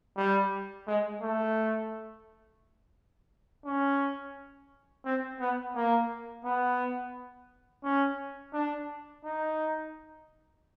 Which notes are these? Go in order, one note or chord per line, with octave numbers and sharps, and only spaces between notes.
G3
G#3
A3
C#4
C4
B3
A#3
B3
C#4
D4
D#4